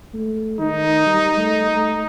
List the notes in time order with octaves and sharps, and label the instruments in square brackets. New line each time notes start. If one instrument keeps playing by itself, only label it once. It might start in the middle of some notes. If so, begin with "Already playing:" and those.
[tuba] A3
[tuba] D#3 [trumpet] D#4
[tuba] G3
A3
A3